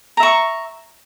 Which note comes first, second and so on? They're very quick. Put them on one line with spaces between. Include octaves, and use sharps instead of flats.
A#5 E5 C#6